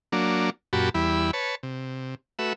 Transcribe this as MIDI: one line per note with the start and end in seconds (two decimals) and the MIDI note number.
0.12 0.50 54
0.12 0.50 58
0.12 0.50 62
0.73 0.89 42
0.73 0.89 46
0.73 0.89 66
0.73 0.89 67
0.73 0.89 81
0.73 0.89 83
0.94 1.31 40
0.94 1.31 55
0.94 1.31 64
0.94 1.31 83
1.33 1.55 71
1.33 1.55 73
1.33 1.55 81
1.63 2.15 48
2.39 2.53 57
2.39 2.53 66
2.39 2.53 71
2.39 2.53 76